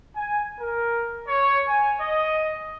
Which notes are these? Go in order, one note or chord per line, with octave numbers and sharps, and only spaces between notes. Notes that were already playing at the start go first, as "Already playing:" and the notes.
G#5
A#4
C#5
G#5
D#5